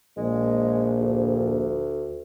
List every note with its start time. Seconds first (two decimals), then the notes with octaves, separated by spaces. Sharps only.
0.17 A#1 G#3
1.01 D2